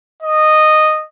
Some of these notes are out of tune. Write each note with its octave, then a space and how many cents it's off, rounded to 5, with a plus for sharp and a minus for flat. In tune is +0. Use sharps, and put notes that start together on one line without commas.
D#5 -10